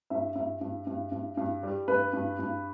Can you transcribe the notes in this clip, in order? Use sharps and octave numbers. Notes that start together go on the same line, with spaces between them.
G2 E5
G2 E5
G2
G2
G2
G2
G3
G2 B4
G2
G2